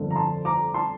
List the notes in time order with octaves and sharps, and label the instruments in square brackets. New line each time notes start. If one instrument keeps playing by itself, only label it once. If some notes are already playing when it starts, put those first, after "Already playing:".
Already playing: [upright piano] G1 F2 D3
A#5
A5 C6
A#5 D6
A5 C6